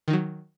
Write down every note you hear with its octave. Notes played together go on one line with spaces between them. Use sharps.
D#3 F#3 D#4